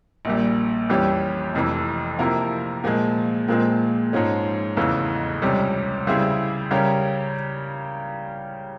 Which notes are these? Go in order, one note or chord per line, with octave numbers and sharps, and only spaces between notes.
A#1 A#2 G3
F2 E3 G3 C#4 G4
F1 F2 C3 E3
C3 F3 A#3 E4 A#4
A#2 F3 G#3
A#2 F3 G#3 C4
G#2 F3 G#3 C#4
F1 E2 C#3 E3
C#2 C3 G3 C#4
C#3 G3 C4 E4 G#4
C#3 G3 C#4 G4 A#4